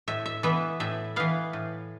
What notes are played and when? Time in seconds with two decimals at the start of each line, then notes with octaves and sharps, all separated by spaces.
0.08 A2 E5
0.26 E5
0.43 E3 B3 E5
0.80 A2 E5
1.16 E3 B3 F5
1.53 A2